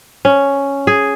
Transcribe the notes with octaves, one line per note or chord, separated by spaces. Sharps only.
C#4
G#4